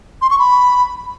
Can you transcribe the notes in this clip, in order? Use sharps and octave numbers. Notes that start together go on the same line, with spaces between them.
C6
C#6
B5